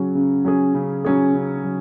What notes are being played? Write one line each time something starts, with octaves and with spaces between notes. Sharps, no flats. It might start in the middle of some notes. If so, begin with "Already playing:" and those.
Already playing: C#3 F#3 C#4 G#4
C#3
F#3 C#4 G#4
C#3
F#3 C#4 G#4
C#3
F#3